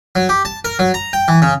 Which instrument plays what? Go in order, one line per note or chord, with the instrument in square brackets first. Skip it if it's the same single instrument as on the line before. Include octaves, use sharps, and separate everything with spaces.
[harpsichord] F#3
G4
A5
A#4
F#3
A#5
G5
E3
C#3